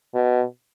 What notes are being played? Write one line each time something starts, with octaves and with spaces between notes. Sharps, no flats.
B2